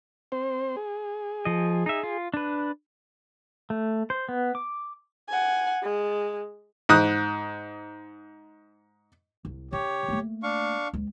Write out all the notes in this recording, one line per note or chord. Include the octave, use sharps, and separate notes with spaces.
C4 C5
G#4
F3 D#5
D#4 E5
F4
D4 B4
A3
C5
B3
D6
F#5 G#5
G#3
G#2 D#6 F#6
C2
C#3 G4 C#5
A3 A#3
D4 F5 C#6
C#2